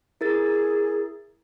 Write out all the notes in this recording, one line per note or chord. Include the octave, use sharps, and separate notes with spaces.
E4 G#4 A#4 A6